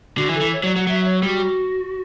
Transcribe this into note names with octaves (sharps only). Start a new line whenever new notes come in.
D3 F#4
E3
A4
E3
C#5
F#3 D5
F#3 F#5
F#3 E5
C#5
G3 F#4